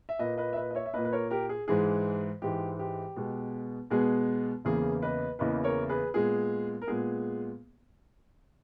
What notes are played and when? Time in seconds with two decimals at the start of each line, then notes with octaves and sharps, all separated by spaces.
0.09 E5
0.19 A#2 A#3 B4 D#5
0.38 B4 D#5
0.53 E5
0.56 B4 D#5
0.71 D#5
0.75 C#5 E5
0.86 E5
0.94 A#2 A#3 B4 D#5
1.05 B4
1.13 A#4 C#5
1.30 G4 A#4
1.49 G#4
1.68 G#2 E3 G#3 G#4
2.42 G#2 E3 G#3 G4
2.79 G4
3.16 B2 G#3 B3
3.90 B2 G#3 B3 G#4
4.65 E2 C#3 E3 A#3 G#4
5.02 B4 D#5
5.39 E2 C#3 E3 A#3 B4 D#5
5.64 A#4 C#5
5.89 G#4 B4
6.14 A#2 G#3 B3 G#4
6.82 A#4
6.88 A#2 G#3 B3 G#4